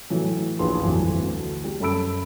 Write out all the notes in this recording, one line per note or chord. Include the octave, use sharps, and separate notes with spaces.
A2 E3 F#3
A#1 D#2 E3 B4 A5 C6
G1 F2 E3 F#3
D2
G3
F#2 A4 A5 B5 E6 D7